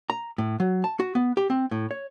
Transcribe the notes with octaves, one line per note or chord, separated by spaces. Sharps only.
A#5
A2
F#3
A5
F#4
B3
G4
C4
A2
C#5